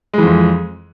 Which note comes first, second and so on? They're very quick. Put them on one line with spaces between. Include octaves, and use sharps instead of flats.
G#3 E3 F2